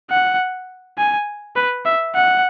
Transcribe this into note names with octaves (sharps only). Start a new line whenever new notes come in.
F#5
G#5
B4
E5
F#5